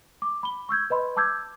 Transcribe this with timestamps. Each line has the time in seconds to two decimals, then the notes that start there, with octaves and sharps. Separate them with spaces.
0.22 D6
0.43 B5 G7
0.69 C#6 E6 G6 G#6
0.90 B4 D#5 B5 C6
1.16 A5 D6 E6 G6 G#6